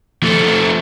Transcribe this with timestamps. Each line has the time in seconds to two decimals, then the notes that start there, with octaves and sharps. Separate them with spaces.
0.23 F3 A3